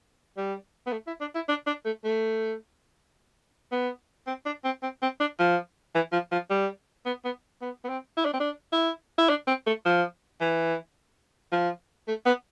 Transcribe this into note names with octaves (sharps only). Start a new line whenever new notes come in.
G3
B3
A3
E4
D4
E4
D4
D4
A3
A3
B3
C4
D4
C4
C4
C4
D4
F3
E3
F3
F3
G3
B3
B3
B3
B3
C4
E4
D4
C4
D4
E4
E4
D4
C4
A3
F3
E3
F3
A3
B3